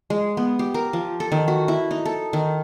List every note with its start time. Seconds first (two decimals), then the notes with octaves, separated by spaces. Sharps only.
0.10 G#3
0.37 B3
0.59 G4
0.74 A#4
0.93 F3
1.20 A4
1.32 D#3
1.48 F#4
1.68 E4
1.91 D#4
2.05 A4
2.33 D#3